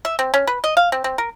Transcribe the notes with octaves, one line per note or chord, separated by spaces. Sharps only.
E5
C4
C#4
B4
D#5
F5
C4
C4
A#4